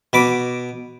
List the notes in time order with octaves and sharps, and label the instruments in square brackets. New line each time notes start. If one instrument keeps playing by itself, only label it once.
[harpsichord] B2 B5 D6